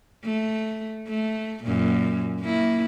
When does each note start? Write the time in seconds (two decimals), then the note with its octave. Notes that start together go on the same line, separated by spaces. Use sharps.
0.25 A3
1.08 A3
1.64 F#2 A#2
2.41 A#3 E4